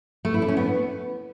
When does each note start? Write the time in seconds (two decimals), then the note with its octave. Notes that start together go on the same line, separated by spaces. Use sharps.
0.25 A3
0.34 E4
0.42 D4
0.48 C#4
0.57 B3